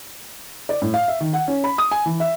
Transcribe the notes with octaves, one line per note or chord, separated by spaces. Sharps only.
D5
A2
F5
E5
D#3
F#5
C#4
B5
D#6
G#5
E3
E5